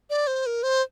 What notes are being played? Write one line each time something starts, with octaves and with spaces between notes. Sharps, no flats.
D5
C5
A#4
C5